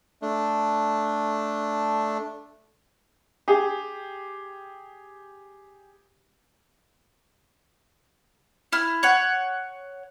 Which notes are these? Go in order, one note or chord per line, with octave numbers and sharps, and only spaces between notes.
A3 D4
G4 G#4
E4 F6
C#5 F#5